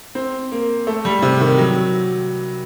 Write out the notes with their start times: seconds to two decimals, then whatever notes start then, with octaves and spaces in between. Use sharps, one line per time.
0.15 C4
0.52 A#3
0.87 A3
1.05 G3
1.22 C3
1.41 D#3
1.58 F#3